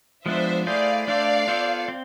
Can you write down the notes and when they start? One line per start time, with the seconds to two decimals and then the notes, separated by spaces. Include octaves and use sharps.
0.25 F3 G#3 B3 D4 C5 E5
0.66 A3 E4 G#4 C5 D5 F5
1.07 A3 D4 A4 C5 D5 F5
1.47 B3 F4 A4 C5
1.88 C4